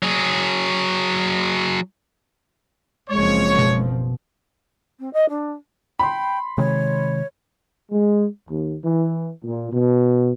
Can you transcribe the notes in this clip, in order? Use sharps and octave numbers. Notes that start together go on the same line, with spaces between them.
F#3 G#4
F#1 F3 G#3 C4 C#5
B2
C4
D#5
D4
G5 B5 C6
C3 D#3 G#3 C#5
G#3
D#2
E3
A#2
B2